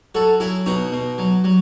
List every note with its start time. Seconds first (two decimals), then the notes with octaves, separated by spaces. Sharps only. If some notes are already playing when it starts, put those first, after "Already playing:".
0.15 F#3 F#4 A4
0.40 F#3 E4 G#4
0.66 B2 D#4 F#4
0.92 B2
1.18 F#3
1.44 F#3